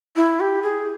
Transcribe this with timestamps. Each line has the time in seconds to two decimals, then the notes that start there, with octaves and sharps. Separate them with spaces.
0.16 E4
0.40 G4
0.62 G#4